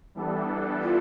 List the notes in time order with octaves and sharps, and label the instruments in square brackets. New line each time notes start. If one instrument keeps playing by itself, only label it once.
[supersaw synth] E3 G3 B3 D4 A4
[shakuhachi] F4